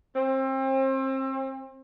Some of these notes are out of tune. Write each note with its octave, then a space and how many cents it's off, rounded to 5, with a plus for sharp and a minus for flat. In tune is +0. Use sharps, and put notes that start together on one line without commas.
C4 +30